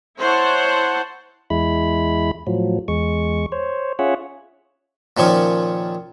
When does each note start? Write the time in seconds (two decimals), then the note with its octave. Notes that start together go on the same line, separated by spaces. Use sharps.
0.19 E4 C5 C#5 F#5 A5
1.50 E2 G#3 E4 B5
2.47 A2 F3 F#3
2.88 E2 G#3 C#6
3.52 C5 C#5
3.99 C#4 F4 G#4 C#5 E5 F#5
5.17 A#2 D#3 F3 C#4